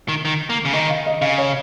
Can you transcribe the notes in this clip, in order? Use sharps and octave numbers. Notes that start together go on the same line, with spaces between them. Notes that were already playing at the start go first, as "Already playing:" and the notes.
D#3
D#3
A#3
C#3
D#3 D#5
F5
D#5
C#3 F5
C#5